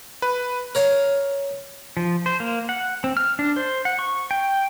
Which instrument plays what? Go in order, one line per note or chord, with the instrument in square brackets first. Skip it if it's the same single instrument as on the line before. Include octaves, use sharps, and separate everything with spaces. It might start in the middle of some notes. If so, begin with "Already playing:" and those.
[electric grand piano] B4
[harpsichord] A#4 C#5 F5
[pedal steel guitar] F3
C5
A#3
F#5
C4
F6
D4
C5
F#5
C#6
G5